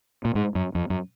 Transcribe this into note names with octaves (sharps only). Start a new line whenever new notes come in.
A#2
G#2
F#2
F2
F#2